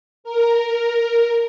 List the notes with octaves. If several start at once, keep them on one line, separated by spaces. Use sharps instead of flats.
A#4